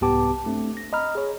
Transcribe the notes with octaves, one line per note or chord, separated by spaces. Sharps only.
C2 G#2 B3 G4 A5 D6
A3 C4 D4
A#6
D#5 A#5 B5 F6
G#4 C#5